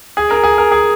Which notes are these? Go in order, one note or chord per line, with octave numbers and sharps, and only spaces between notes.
G#4
A#4
G#4
A#4
G#4